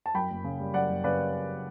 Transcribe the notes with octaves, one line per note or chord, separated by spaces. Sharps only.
A5
F#2 G5 B5
F#1
C#3
G3
F#2 D5 F#5
F#1
C#3 B4 D5